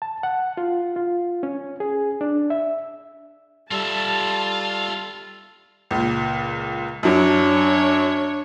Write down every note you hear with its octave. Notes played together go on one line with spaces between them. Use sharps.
A5
F#5
F4
F4
C#4
G#4
D4
E5
G3 F4 A4 E5 A5
C#2 A#2
F#2 F#3 D4 C#5